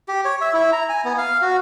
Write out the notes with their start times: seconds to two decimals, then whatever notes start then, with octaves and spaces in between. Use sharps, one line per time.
0.08 G4
0.25 C#5
0.41 E5
0.54 E4
0.72 A#5
0.89 G#5
1.05 B3
1.18 F5
1.42 F#4